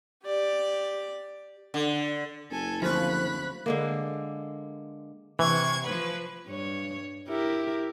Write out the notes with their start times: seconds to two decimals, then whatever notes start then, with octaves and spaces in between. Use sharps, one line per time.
0.24 G4 D5
1.74 D3
2.51 F#1 A4 G#5
2.82 D2 F3 C4 B5 C#6 F#6
3.66 D3 G#3 A#3
5.39 C3 E3 C#6 G#6
5.83 F3 B4
6.47 G2 C#5
7.28 E4 G4 A#4